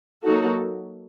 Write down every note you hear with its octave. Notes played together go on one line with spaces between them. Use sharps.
F#3 A#3 D#4 F#4 A4